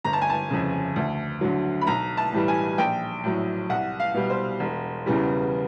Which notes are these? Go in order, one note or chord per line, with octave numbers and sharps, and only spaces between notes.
G1 A#5
A5
G#5
A5
F2 C#3
D2
D3 F#3
B5
B1 A#5
A5
A2 E3 G3
G#5
A#1 G5
A2 F#3
C2 F#5
F5
B2 G3
C5
E1
E2 C#3 E3 G3